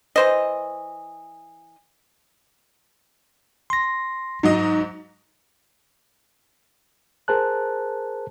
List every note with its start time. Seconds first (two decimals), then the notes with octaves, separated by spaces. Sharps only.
0.16 E3 C5 D#5
3.70 C6 A#6
4.43 G#2 F#3 D#4 D#5
7.28 G#4 A#4 C5 A5 F#6